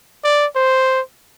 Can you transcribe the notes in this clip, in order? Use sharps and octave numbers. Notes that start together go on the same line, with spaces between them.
D5
C5